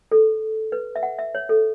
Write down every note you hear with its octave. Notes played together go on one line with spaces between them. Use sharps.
A4
B4
E5
F#5
E5
C#5
A4